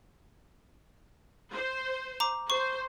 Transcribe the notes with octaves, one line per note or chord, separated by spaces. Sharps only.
C5
A#5 D6
C5 C#6